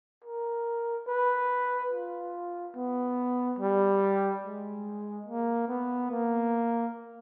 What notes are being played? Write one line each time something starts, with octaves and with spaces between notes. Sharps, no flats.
A#4
B4
F4
B3
G3
G#3
A#3
B3
A#3